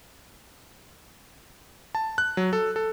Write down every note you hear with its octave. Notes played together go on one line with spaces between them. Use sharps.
A5
F#6
F#3
A4
A4